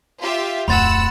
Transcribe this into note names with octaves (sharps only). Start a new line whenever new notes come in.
F4 G4 E5
D1 F2 F#5 B5 C6 E6 A6